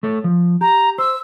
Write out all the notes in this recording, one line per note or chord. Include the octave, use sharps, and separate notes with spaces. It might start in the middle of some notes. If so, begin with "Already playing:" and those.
A3 A4 C#5
F3
G4 A#5
C5 E6